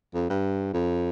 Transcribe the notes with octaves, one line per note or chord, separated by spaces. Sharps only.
F2
G2
F2